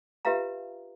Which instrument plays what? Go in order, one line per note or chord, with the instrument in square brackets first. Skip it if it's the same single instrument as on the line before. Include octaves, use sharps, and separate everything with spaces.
[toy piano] F4 G4 B4 E5 F5 A#5